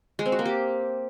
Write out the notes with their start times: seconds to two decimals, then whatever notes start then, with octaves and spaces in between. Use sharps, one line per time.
0.19 G#3
0.26 C4
0.32 F#4
0.39 A#3
0.45 G4